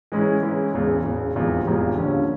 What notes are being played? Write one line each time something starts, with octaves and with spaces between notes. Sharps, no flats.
G#2 E3 G#3 C#4 E4
G#2 E3 G#3 C#4 E4
E1 E2 C#3
E1 E2 C#3
F1 E2 C3 F3 G#3
F1 E2 C3 F3 G#3
D#2 D3 F3 G#3 C#4